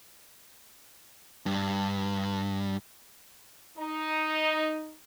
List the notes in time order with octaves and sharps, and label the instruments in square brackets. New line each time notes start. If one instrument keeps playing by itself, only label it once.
[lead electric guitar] G2
[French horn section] D#4